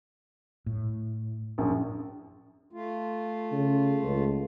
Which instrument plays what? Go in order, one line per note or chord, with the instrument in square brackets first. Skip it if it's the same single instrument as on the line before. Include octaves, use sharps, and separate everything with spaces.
[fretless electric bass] A2
[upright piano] A#1 F#2
[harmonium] A3 F4
[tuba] C#3
C#2